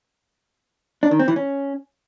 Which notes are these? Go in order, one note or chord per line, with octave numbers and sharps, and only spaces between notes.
D4
D#3
C4
E3
C#4